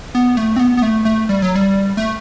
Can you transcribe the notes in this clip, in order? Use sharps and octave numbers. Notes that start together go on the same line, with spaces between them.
B3
A3
C4
B3
B3
A3
A3
G3
F#3
G3
A3